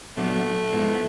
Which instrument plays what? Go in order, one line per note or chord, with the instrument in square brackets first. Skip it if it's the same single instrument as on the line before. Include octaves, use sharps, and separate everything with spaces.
[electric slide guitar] A#2 F#3 B3 D4 F#4 [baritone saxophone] A3
[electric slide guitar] G#2 F3 G#3 B3 E4